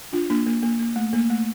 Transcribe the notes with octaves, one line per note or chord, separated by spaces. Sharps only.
D4 F4
A#3 D4
A#3
A#3
A#3
A3
A#3
A3